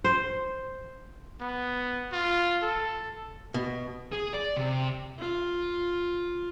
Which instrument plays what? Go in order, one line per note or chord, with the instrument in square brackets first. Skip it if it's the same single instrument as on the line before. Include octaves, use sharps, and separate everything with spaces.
[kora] C5
[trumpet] B3
F4
A4
[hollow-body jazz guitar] B2
[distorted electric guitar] G#4
D5
C3
[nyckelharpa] F4